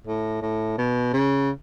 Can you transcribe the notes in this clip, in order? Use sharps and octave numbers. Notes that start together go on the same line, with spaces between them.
A2
A2
B2
C#3